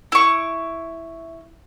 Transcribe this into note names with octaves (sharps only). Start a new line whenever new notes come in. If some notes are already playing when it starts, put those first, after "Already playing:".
E4 C#6